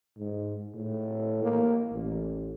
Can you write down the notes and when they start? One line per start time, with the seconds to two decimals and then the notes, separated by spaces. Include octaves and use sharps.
0.17 G#2
0.74 A2
1.43 A#3
1.92 A1